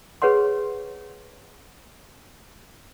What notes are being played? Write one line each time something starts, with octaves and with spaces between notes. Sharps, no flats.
G#4 B4 C#5 F#5 C6